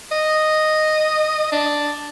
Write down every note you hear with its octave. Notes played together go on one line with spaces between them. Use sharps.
D#5
D4